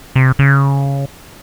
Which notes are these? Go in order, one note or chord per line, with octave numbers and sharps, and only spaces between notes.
C3
C#3